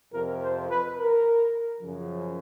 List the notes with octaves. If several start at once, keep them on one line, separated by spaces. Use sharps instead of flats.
F2 C3 F3 A#4
C5
B4
A#4
F#2 C#3 F3